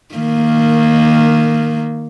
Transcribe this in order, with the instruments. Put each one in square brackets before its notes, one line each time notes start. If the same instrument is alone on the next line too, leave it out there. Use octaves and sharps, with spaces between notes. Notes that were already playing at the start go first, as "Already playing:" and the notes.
[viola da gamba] D#3 A#3